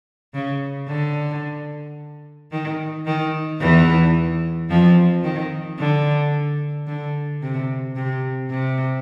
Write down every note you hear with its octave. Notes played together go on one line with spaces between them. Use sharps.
C#3
D3
D#3
D#3
E2 E3
F2 F3
D#3
D3
D3
C3
C3
C3